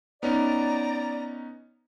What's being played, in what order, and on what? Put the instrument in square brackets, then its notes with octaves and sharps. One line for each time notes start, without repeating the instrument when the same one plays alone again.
[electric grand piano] B3 C#4 D#4 [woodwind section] D5 [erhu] A#5